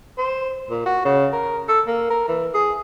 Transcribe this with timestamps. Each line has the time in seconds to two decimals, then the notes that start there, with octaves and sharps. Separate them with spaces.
0.18 C5
0.70 A#2
0.86 F#4
1.05 C#3
1.32 A#4
1.68 A4
1.87 A#3
2.10 A#4
2.28 E3
2.54 G#4